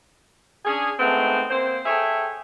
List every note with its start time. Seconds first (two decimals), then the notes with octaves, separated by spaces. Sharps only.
0.65 C#4 D4 G#4
0.99 G#3 A3 B3 C4 D#4
1.49 A#3 C4 C5
1.85 G#4 A4 C#5 E5 G5